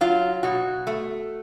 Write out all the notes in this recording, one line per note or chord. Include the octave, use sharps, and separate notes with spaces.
F#3 F4
B2 F#4
A3